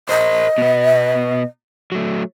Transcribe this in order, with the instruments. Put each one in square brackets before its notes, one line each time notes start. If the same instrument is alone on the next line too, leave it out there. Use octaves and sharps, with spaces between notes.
[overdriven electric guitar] A#4 C5 [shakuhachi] D#5
[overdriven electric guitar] B2 B3
F#3 A3